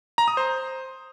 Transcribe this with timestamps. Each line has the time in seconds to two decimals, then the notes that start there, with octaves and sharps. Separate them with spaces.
0.18 A#5
0.28 D#6
0.37 C5